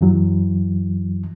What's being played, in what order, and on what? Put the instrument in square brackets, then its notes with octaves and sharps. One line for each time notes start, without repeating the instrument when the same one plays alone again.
[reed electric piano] F#2 E3 F#3